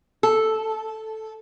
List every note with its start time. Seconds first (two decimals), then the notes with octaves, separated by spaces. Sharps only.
0.23 A4